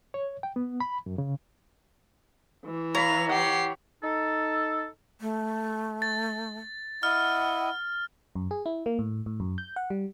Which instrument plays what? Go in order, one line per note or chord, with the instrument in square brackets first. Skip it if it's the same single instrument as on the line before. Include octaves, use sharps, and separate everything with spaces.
[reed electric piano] C#5
G5
B3
B5
F#2
C#3
[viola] E3
[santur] C#5 B5 [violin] F5 F7 [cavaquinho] A#5
[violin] G4 C7 [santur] F#5
[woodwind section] D#4 A4
[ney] A3
[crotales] A6
[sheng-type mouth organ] E4 D#5 [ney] F#5 [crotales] F6
[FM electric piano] F#2
G#4
E4
A#3
A2
A2
F#2
G6
F#5
G3